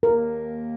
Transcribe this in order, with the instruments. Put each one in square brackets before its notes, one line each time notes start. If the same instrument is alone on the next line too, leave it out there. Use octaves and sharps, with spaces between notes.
[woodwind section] D#2 D#3 A#3 [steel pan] A#4